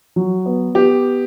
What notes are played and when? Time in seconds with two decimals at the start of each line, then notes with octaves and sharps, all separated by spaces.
0.16 F#3
0.46 B3
0.75 B3 G4